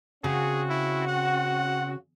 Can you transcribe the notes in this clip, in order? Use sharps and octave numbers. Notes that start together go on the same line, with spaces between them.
C#3 C4 C#4 F#4 G#4
E4
F#5